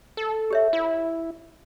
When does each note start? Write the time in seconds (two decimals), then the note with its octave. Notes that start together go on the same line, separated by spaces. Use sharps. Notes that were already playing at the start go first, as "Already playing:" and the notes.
0.17 A4
0.50 G4 C#5 E5
0.73 E4